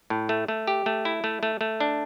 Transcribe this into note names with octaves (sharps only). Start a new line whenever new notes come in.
A2
A3
A3
G4
A3
E4
A3
A3
A3
D4